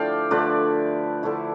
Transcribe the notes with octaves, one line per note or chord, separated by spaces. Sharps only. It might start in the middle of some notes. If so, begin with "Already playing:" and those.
Already playing: D3 F3 A3 E4 D5 F5 G5
D3 F3 A3 E4 B4 D5
D3 F3 A3 E4